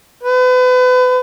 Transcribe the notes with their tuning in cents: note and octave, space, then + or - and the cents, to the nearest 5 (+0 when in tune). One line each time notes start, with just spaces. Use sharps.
B4 +35